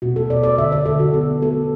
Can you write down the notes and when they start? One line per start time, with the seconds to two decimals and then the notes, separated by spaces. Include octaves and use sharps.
0.02 B2 F#4
0.16 A4
0.30 B2 D5
0.43 D5
0.58 D3 E5
0.72 D5
0.86 D3 A4
1.00 F#4
1.14 B3 A4
1.42 B3 A4